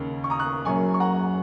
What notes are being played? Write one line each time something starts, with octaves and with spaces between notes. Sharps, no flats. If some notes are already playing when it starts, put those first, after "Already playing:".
Already playing: D#2 C#3 A#3 C#4
C#6
A#5 D#6
C#6 F#6
F#1 F#2 F#3 A#3 C#4 G#5 C#6
C#6
F#5 A#5